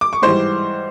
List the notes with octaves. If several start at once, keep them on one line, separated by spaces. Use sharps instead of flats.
D6
C#6
G#2 E3 G3 C5 C6